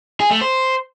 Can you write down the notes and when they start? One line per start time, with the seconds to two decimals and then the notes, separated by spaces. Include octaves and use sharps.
0.20 G#4
0.31 A3
0.41 C5